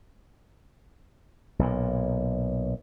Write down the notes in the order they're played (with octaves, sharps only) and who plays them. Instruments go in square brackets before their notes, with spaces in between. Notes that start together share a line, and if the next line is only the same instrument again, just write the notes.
[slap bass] B1 A#2